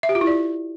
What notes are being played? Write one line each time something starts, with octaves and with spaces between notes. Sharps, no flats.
E5
G4
F4
E4
D5